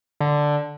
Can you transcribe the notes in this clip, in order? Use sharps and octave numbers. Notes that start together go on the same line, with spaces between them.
D3